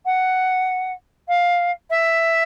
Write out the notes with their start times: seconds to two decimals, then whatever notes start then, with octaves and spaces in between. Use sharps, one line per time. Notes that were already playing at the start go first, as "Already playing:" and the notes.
0.05 F#5
1.28 F5
1.90 E5